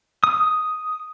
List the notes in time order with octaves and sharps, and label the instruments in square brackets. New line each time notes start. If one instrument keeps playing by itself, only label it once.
[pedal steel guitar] D#6